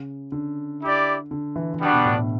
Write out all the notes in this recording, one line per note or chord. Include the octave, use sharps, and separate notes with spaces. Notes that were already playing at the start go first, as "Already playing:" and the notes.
Already playing: C#3
D3
E4 G4 D5
D3
E3
E3
D3 G3 B3 D4 F#4
B2
A2
A2